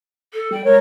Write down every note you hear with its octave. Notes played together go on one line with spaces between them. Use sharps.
A4
G3 G5
G#3 A#4 C#5